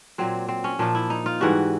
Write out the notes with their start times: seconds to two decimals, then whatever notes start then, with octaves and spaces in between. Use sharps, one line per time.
0.18 A#2 F#3 C4
0.49 C4
0.64 C#4
0.79 A#2 F3 D4
0.95 E4
1.10 D#4
1.26 F4
1.41 G#2 E3 G3 F#4